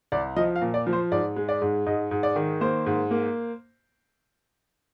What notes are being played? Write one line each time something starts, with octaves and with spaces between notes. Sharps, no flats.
C2 D5
F3 D#5
F5
A#2
D5
F3
C5
G#2 D5
G#3
D5
G#2
G#2 D#5
G#2
D5
D#3
A#3 C5
G#2
A#3